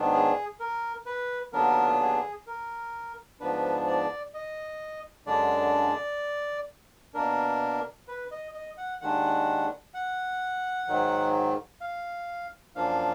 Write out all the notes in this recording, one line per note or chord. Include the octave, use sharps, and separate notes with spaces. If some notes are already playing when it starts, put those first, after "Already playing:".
Already playing: G#2 D#3 F#3 B3 D4
G#4
A#4
B4
D#2 D3 F#3 B3 D4 A#4
G#4
A#4
G#2 F3 B3 D4 B4
D5
D#5
F#2 D3 G#3 D4 D5
B2 A#3 D4 A#4
B4
D#5
D#5
F#5
D#2 D#3 G#3 D4 F#5
F#5
G#2 D#3 F#3
F5
F#2 F3 A#3 D4 F5